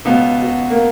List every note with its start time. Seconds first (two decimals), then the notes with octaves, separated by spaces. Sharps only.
0.05 C#2 B2 B3
0.42 F#4
0.70 A#3